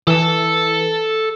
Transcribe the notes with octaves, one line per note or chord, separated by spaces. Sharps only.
E3 A4 A5